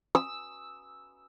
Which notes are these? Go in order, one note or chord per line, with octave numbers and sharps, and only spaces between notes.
E6